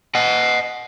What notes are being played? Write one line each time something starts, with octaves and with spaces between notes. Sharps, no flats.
D#5 F#5